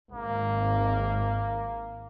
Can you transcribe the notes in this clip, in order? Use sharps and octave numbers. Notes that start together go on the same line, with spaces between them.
G#1 A#3